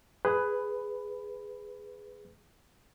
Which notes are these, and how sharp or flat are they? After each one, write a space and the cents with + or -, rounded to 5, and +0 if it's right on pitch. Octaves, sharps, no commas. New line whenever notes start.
G#4 +0 B4 +10